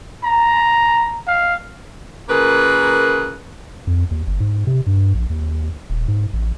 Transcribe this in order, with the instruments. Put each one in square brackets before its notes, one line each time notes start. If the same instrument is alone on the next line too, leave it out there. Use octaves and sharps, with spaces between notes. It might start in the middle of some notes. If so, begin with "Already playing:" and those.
[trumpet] A#5
F5
[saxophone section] C#3 A#3 F4 G#4 A#4 B4
[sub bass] F2
D#2
G1
G#2
C3
G2
A#1
D#2
D#1
G#2
A1